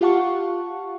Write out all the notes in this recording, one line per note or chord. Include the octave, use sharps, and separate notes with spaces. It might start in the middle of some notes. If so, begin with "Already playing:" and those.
F4 G4 F5 F#5 A5 C#6